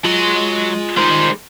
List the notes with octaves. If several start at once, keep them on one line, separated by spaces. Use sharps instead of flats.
F#3 G#3 F4 C6
G3 G#3 D#4 A#4 C5